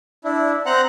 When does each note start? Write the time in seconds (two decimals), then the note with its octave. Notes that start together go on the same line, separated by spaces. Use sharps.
0.24 D4 E4
0.66 C4 C5 F#5 A#5 F#6